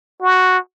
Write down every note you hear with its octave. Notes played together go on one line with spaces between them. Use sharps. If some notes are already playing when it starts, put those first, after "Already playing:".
F#4